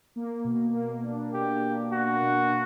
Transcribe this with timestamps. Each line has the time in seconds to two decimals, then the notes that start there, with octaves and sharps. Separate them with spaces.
0.16 A#3
0.44 B2
0.74 A#3
1.03 D4
1.33 B2 G4
1.63 A#3
1.91 A#3 F#4
2.21 B2
2.51 B2